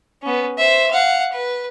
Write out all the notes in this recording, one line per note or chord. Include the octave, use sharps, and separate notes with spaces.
B3 C#4
C5 E5
F5 F#5
B4